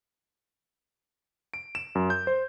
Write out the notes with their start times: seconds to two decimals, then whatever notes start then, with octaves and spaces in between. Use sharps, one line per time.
1.54 D7
1.75 E7
1.95 F#2
2.10 G6
2.27 C5